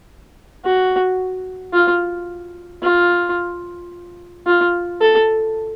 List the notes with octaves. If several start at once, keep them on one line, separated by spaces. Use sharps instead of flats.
F#4
F4
F4
F4
A4